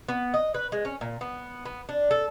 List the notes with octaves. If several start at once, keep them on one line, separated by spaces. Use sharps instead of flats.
B3
D#5
B4
G#3
C#4
A#2
B3
B3
D4
A4